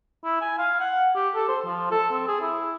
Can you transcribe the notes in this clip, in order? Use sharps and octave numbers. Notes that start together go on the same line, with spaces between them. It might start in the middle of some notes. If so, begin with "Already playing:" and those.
E4
G#5
F5
F#5
G4
A4
C5
F3
A4
C4
G#4
E4